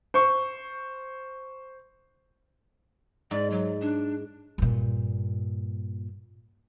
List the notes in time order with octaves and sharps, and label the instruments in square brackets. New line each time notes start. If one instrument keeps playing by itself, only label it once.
[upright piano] C5 C#6
[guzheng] G#2 [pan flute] D5
[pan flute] F#3
D4
[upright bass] G2 A#2